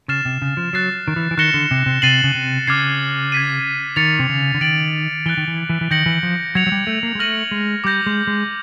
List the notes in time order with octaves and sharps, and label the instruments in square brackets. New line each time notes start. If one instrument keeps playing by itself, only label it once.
[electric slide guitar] C#3 [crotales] F6 A6 C7 E7
[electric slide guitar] C3
C#3
F3
[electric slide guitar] F#3 [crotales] F#6 A6 C7
[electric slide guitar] D#3
E3
E3
[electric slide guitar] D#3 [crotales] F#6 A#6 C#7 E7 G7
[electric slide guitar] D3
C3
C3
[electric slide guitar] C3 [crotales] A6 C7 D#7 F#7
[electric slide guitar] C#3
C3
[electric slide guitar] C#3 [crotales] D6 F6 G#6 C7
[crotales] G#6 B6 D#7
[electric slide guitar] D#3 [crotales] A6 C#7 F7
[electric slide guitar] C3
C#3
D3
[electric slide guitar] D#3 [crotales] A6 D7 F#7
[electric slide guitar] E3 [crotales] F#6 A6 D7 G7
[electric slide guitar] D#3
E3
E3
E3
[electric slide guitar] D#3 [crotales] G6 A#6 C#7 F#7
[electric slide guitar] E3
F3
[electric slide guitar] F#3 [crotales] G#6 C#7 F7
[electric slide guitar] F#3
G3
A3
A#3
G#3
[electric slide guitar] A3 [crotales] F6 A#6 D#7 F#7
[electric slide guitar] G#3
[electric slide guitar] G3 [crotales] D6 G6 A#6
[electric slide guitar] G#3
G#3